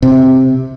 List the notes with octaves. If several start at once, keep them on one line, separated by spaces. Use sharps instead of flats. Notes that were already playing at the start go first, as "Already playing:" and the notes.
C3